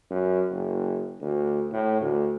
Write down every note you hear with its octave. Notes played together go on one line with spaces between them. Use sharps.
F#2
F#1
D2
A2
D2